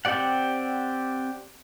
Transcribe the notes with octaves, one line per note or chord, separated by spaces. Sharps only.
C4 G4 D5 F#5